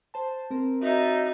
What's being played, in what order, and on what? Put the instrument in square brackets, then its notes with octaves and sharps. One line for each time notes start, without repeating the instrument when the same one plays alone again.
[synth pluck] C5 A5
C4 A#4
[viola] D#4 [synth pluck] F#4 A6 [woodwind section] C#5 D#5 E5